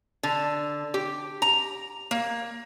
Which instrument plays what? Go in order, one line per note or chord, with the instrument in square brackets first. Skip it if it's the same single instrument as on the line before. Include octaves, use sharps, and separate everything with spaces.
[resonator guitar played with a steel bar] D3
G4
A#5
A#3